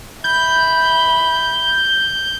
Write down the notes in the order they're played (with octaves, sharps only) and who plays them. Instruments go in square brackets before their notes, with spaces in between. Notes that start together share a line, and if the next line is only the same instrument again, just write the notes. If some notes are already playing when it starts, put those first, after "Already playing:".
[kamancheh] E5 B5 [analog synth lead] G6